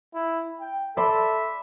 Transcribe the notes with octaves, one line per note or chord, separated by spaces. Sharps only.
E4
G5
A4 D5 E5 B5 C6